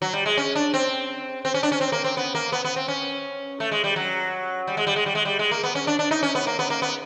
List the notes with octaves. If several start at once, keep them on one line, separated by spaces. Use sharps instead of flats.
F#3
G3
G#3
C#4
D4
C4
C4
C#4
D4
C#4
C4
A#3
C4
B3
A#3
B3
B3
C4
C#4
A3
G#3
G3
F#3
G3
G#3
G3
G#3
G3
G#3
G3
G#3
A#3
B3
C#4
D4
D4
D#4
C#4
B3
A#3
B3
A#3
B3